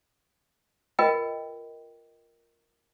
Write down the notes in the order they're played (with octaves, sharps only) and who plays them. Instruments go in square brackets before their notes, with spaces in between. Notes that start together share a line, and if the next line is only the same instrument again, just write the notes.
[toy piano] F4 A#4 B4 D#5 G5